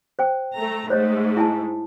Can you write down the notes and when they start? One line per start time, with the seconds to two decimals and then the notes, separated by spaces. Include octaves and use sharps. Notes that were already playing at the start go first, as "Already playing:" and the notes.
0.19 C5 G5
0.57 A3 A#5
0.90 G#2 A3 C5 C#5 D#5
1.37 E4 G#5 A5